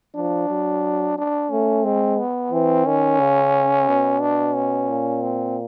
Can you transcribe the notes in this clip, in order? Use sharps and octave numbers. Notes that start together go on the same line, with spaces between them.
F3 D4
F#3
D4
A3 C#4
G#3 C4
B3
E3 C4
D#3 C#4
C#3
B2
D4
C#4
A#2
C4